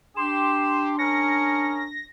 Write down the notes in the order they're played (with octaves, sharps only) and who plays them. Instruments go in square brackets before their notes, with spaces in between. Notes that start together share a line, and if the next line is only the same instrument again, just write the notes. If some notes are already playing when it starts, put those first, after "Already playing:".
[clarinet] D4 [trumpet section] G4 [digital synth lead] C6 [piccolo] E7
[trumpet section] C#4 G#4 A#4 [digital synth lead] A#6 [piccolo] C#7